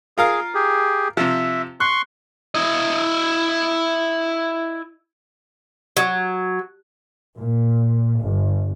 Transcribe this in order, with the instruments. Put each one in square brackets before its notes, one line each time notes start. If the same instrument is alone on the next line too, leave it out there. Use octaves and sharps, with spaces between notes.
[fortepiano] F4 A#4 F5 [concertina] G#4
[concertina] G4 G#4
[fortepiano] C3 F3 [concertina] E5
[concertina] C6 C#6 [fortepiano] F#6
[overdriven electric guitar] E4 D#5
[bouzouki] F#3
[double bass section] A#2
G1